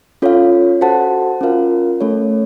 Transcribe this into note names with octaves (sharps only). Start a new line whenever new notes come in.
C#4 F4 A4 C#5 F5
F#4 A4 C5 F#5 A5
C#4 F4 A#4 F5
A3 C#4 A4 C#5